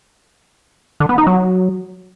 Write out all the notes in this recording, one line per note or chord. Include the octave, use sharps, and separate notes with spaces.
D3
B3
D#4
F#3